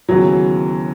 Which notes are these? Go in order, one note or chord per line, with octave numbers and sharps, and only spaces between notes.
D#2 C#3 E3 F#3 B3